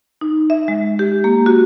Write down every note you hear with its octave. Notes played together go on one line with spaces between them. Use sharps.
D#4
E5
G#3
G4
A#3
F#4